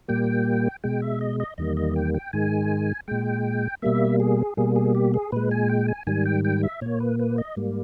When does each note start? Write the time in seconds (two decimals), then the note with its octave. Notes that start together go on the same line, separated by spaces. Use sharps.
0.08 A#2 G3 A#3 G5
0.84 B2 G#3 G5
1.02 E5
1.21 D#5
1.40 D#5
1.58 E2 D#3 G3 A#3 D#5
1.77 D#5
1.96 G5
2.14 G5
2.33 G#2 D#3 G#3 G#5
3.08 A#2 G#3 G5
3.82 B2 G3 A#3 E5
4.20 G#4
4.57 B2 G3 A#3 G#4
4.76 G#4
4.95 G4
5.14 G#4
5.32 A#2 G#3 B4
5.51 G#5
5.69 G5
5.88 G#5
6.07 G#2 D#3 G3 G#5
6.26 G5
6.45 G5
6.63 E5
6.81 A#2 A#3 C#5
7.00 B4
7.19 B4
7.38 D#5
7.57 G#2 G3 A#3